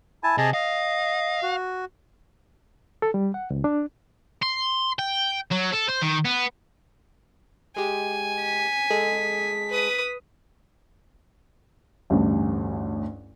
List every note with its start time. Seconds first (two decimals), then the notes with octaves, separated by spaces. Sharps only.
0.24 E4 G#5 A5
0.38 C3 G#4 D#5 A5
0.54 D#5 F5
1.43 F#4
3.02 A4
3.14 G3
3.34 F#5
3.50 C#2
3.64 D4
4.42 C6
4.99 G5
5.51 F#3
5.72 A4
5.89 C5
6.02 D#3
6.25 B3
7.76 G#3 G4 G#5
8.42 B6
8.90 G#3 G#4 A4
9.70 B4 D#6
12.10 A1 D2 G2